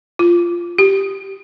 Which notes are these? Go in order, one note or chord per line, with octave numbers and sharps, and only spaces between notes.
F4
G4